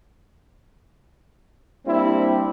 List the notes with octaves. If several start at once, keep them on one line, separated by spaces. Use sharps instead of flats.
G3 A#3 C4 D4 E4